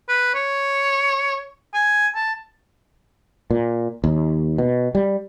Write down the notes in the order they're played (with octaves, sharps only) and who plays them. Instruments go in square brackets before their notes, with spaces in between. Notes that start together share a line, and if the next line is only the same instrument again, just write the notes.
[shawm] B4
C#5
G#5
A5
[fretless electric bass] A#2
D#2
B2
G3